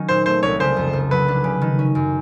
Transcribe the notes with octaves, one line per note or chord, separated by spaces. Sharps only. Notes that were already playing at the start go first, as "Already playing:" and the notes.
Already playing: D#3 F#3 C#4
A#2 C5
A3 C5
C2 C#5
C#3 C5
F2
F2
F#3 B4
D4
C#3
D#3
C#4
F#2